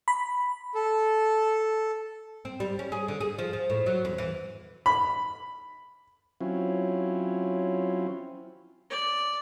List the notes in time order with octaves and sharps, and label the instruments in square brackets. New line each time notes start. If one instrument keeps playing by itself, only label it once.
[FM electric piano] B5
[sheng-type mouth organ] A4
[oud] C4
G3
C#4
G#4
D3
G#4
F3
F3
A2
F#3
E2
E3
[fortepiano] B5
[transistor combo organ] F#3 C4 C#4 E4 F4
[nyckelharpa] D5